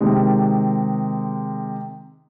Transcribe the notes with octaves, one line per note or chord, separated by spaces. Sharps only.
C3 D#3 G#3